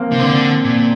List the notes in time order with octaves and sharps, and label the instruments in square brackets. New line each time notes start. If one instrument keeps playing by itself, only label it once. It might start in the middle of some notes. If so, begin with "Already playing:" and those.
Already playing: [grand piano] F3 A#3 C4
[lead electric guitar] C3
[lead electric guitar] D3 [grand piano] C4
[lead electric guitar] A#2